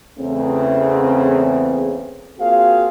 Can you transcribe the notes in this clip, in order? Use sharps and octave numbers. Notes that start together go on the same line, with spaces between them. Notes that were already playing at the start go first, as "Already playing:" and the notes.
E2 C#3 A3 C4
A#3 C4 F4 F#4 G#4 F5